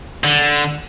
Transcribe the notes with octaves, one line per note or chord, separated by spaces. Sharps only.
D3